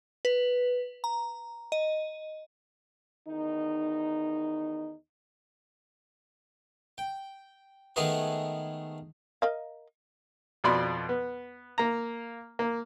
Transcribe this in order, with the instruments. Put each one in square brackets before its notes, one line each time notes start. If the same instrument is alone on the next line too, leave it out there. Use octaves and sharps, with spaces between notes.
[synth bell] B4
A#5
D#5
[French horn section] E2 D#3 D#4
[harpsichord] G5
D#3 G#3 A3 B3 G#4 B4
[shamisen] A#4 D#5 F5
[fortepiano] F2 B2 D5 B5 C6
B3
A#3 A#5
A#3